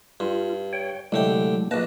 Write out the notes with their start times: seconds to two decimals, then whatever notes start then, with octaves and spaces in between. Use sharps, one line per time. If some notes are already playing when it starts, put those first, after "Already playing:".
0.20 G2 F4
0.73 C#5 G5
1.12 C2 D3 F#3 G#3 A3 G5
1.71 A#1 A#3 B4 D#5 A5